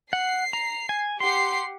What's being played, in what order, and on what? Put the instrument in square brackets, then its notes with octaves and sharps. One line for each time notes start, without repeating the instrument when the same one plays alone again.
[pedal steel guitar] F#5 [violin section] C7
[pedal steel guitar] A#5
G#5
[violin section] G4 F#5 C7 [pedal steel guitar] C6